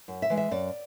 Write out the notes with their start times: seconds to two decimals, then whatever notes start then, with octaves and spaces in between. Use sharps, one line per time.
0.08 F#2
0.22 E5
0.30 E3 G#3
0.37 E5
0.51 F#2 D5